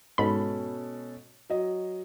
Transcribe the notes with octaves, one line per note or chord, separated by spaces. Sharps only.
G#2 B2 C#4 A4 B5
F#3 D#5